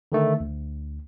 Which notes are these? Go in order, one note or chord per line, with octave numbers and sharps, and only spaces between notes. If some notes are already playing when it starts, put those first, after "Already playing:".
D3 D#3 A3
D2